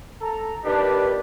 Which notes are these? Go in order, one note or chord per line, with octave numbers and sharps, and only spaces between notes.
A4 A#5
A#2 D#3 D4 G4 B4